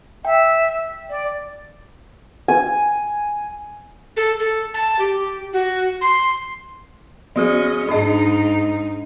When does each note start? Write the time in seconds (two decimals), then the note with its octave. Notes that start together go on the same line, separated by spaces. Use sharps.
0.25 E5 G5
1.10 D5
2.48 G#5
4.16 A4
4.40 A4
4.74 A5
4.99 G4
5.53 F#4
6.01 C6
7.36 F3 C#4 F#4 G#4 D#5
7.89 G#2 D4 D#4 D#5